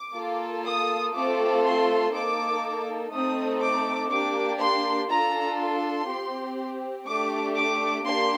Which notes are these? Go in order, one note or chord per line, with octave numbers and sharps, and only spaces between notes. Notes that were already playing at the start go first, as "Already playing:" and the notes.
Already playing: D6
A#3 F4 A4
D#6
A3 C4 F4 A4 D6
C6
A#3 D#4 A4 D6
A3 C4 D#4 A4 D#6
D6
A#3 D4 G4 D6
C6
D4 F4 A4 A#5
C6
C4 G4
A3 D4 G4 D6
D6
A#3 D4 G4 C6